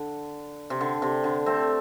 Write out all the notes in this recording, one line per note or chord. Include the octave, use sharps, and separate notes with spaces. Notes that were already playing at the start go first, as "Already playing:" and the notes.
Already playing: D3
C3
D3
C3
D3
A3 C4